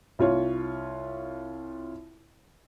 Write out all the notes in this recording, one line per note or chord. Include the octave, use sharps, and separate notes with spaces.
C2 F4 C#5